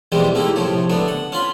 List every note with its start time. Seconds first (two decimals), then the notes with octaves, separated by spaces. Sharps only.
0.12 E2 B2 E3 G3 G#3 C4
0.35 A3 A#3 D#4 E4 G4
0.56 A2 C3 F3 C#5
0.90 D3 A3 B3 D4
1.08 F#5
1.32 C#4 F4 B5 C6